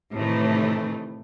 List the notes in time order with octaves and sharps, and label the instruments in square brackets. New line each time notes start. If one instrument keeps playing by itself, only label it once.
[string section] A2 C3 D#3 E3 A3